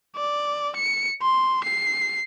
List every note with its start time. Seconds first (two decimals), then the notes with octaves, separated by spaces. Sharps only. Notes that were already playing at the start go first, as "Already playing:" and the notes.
0.16 D5
0.76 C#7
1.22 C6
1.64 C7